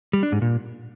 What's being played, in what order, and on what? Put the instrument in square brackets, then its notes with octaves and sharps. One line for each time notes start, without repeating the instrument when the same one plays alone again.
[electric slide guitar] G3
D4
G#2
A#2